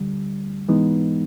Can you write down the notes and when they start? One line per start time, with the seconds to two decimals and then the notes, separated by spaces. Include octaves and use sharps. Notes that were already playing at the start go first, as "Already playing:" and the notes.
Already playing: D2 D3 G3
0.69 G#2 E3 G#3 B3 D#4